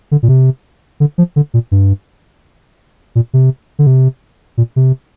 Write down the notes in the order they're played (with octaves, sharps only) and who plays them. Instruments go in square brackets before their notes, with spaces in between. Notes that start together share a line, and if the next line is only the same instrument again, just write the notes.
[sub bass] D3
A#2
C3
D3
F3
D3
A#2
G2
A#2
C3
D3
C3
A#2
C3